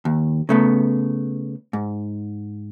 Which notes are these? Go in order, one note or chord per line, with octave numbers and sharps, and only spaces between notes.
D#2
C#3 A3 B3
G#2